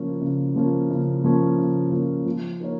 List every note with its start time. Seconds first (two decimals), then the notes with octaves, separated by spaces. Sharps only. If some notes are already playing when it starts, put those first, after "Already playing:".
Already playing: C#3 F3 A#3 C#4
0.21 C#3
0.56 F3 A#3 C#4
0.90 C#3
1.24 F3 A#3 C#4
1.58 C#3
1.92 F3 A#3 C#4
2.26 F3
2.60 A#3 D#4 A#4 C#5